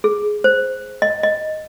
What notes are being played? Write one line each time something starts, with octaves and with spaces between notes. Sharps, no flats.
G#4
C5
D#5
D#5